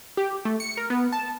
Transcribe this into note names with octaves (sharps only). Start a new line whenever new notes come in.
G4
A3
C#7
A#4
B3
A5